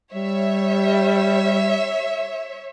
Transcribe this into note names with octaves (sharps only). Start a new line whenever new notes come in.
G3 C#5 E5